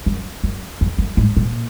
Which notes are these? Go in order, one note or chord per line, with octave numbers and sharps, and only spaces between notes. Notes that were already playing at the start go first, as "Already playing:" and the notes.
F#2
F#2
F2
F#2
G#2
A#2